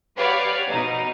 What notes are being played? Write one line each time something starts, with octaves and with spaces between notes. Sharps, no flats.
G4 B4 C#5 D5 F5 F#5
B2 D#4